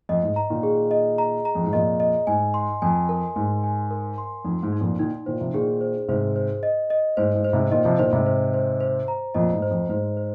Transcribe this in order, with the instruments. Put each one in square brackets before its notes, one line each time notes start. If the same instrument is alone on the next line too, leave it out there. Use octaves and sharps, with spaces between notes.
[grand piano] F2 [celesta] D#5
[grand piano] G#2
[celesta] A#5
[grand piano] A#2 D#3
[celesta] G#4
D#5
A#5
A#5
[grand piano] F2
G#2
[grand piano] F2 A#2 [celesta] D#5
[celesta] D#5
[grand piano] G#2 [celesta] G#5
[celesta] C6
[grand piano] F2 [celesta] G#5
[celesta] A#4
[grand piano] G#2 [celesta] G#5
[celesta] G#5
A#4
C6
[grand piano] F2 [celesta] D#4
[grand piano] G#2
[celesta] D#4
[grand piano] F2 A#2
[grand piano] A#2 D#3 [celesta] D#4
[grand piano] A#2 D#3 [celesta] C5
[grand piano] C3 F3
[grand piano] A#2 D#3 [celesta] G#4
[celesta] C5
[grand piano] G#2 C3 [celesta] C5
[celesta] C5
D#5
D#5
[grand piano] G#2 [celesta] C5
[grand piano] G#2
[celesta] C5
[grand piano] G#2 C3
[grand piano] A#2 D#3 [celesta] D#5
[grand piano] C3 F3
[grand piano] A#2 D#3 [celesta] C5
[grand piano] G#2 C3
[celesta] C5
C5
C5
A#5
[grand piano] F2 A#2 [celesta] D#5
[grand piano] G#2
[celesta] C5
[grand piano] F2
[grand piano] G#2 [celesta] C5
[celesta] C5